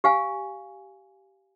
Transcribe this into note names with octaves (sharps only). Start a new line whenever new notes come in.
G4 F5 G#5